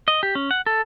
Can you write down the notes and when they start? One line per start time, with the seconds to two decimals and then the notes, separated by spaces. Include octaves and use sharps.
0.08 D#5
0.23 G4
0.35 C#4
0.51 F#5
0.66 A4